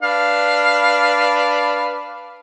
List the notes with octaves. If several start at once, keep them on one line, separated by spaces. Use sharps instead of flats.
D4 B4 F5